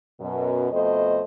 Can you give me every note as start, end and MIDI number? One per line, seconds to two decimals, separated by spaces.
0.20 0.69 42
0.20 0.69 47
0.72 1.21 41
0.72 1.21 47
0.72 1.21 57
0.72 1.21 72
0.72 1.21 75